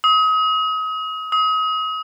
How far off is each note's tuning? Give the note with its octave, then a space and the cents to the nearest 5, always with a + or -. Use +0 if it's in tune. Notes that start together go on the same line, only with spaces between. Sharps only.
D#6 +35
D#6 +35